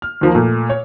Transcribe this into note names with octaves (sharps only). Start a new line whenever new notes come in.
F6
D#2 F3 A#3
A#2 A3
C#5